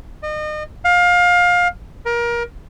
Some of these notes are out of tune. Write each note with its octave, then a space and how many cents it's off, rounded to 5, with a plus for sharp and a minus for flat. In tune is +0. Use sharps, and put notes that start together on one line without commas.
D#5 -35
F5 +25
A#4 +25